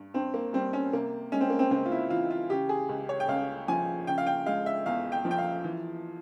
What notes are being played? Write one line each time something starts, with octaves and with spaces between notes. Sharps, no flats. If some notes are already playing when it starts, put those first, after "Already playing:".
Already playing: G2
G2 C4
A#3
G3 C4
C#4
C3 A#3
G#3 C#4
C4
A#3
C4
C#2 C4
F4
E4
E3 F4
F4
C#3 G4
G#4
C#2
C#5
G5
C#2 F5
F3 G#5
C#3 G5
F5
G5
G#3 F5
E5
E2 F5
G5
F3
G5
F5
E3